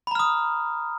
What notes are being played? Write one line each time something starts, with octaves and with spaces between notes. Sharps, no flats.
A#5 B5 D#6 F6